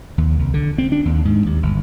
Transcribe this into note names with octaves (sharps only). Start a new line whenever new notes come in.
D#2
C2
D3
C4
D4
D#2
G#2
D#2
G1